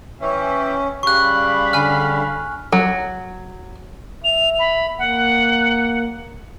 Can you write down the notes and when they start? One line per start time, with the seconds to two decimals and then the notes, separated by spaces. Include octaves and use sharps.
0.21 E3 C#4 E5 G5
1.03 C#3 G3 F5 B5 C#6 F#6
1.73 D3 G#5 F6
2.72 F#3
4.24 E5 F7
4.59 B5
4.99 A#3 F#5